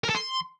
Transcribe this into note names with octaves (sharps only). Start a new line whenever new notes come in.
A#4
A4
C6